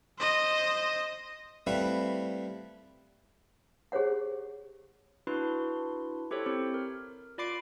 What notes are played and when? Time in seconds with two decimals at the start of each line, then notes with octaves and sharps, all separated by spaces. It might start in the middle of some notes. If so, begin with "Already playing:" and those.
0.18 C5 D#5
1.67 G3 A3 C4 E4 B4 F5
3.92 G4 G#4 C5 C#5 F#5
5.27 D4 E4 F#4 B4 C6
6.31 E4 G4 A4 C5 C#5
6.46 C4 G4 C#5
6.74 A#4
7.38 F4 D5 B5 D6 C7 D7